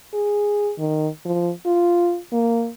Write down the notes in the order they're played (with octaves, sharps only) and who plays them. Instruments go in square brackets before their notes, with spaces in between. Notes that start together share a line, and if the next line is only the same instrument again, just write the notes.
[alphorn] G#4
D#3
F3
F4
A#3